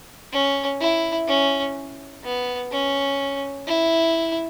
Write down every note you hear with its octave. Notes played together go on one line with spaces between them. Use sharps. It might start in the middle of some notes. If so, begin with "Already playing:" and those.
C#4
E4
C#4
B3
C#4
E4